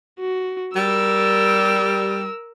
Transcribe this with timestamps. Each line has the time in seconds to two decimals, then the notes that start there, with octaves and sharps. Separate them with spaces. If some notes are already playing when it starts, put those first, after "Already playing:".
0.20 F#4
0.76 G3 A#4 E6